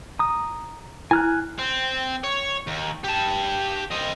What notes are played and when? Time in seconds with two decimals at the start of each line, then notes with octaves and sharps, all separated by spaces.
0.19 A#5 D#6
1.11 E4 G#5 F6 F#6
1.59 C4
2.24 C#5
2.67 D#2
3.05 G4 A5
3.91 C4 D#5